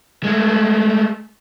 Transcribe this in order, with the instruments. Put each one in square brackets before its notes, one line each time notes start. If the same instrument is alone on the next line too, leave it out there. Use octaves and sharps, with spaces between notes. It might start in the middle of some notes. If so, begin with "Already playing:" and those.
[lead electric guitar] G#3 A3